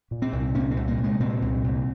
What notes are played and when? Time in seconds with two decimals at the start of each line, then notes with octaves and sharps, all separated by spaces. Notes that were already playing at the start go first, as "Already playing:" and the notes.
0.11 A#2
0.22 C4
0.33 C2
0.55 A#2 C#4
0.71 C4
0.77 C2
0.87 A#3
0.98 C2
1.04 G#3
1.20 A#2 C4
1.42 C2
1.64 C2